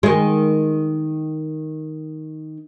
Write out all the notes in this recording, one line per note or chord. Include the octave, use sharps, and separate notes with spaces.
D#3 G#3